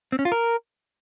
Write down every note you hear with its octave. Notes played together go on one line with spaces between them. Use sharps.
C4
C#4
F4
A#4